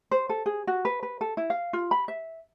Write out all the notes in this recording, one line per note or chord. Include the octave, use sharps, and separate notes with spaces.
C5
A4
G#4
F#4
B4
B4
A4
E4
F5
F4
B5
E5